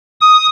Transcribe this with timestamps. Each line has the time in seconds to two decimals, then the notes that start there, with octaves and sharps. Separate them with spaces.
0.21 D#6